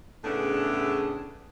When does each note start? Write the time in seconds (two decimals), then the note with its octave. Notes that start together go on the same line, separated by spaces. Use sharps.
0.24 A2 C#3 A3 B3 D4 G#4